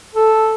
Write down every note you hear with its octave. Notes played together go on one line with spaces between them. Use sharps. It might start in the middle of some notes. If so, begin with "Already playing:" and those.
A4